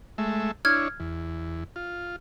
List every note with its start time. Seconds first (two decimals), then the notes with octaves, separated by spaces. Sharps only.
0.18 G#3 A3 E5
0.65 D4 E4 C#5 F6 G#6
1.00 E2
1.76 F4